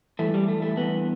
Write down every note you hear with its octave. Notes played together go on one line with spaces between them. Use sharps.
G2 E3 A3
G3
A3
A3
G2 E3 B3